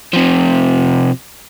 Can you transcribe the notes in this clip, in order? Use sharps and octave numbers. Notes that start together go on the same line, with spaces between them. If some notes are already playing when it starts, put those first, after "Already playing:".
C3 F3